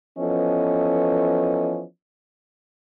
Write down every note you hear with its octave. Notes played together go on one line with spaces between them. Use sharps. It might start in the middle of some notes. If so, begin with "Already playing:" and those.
E3 F3 B3 C#4 A4 D#5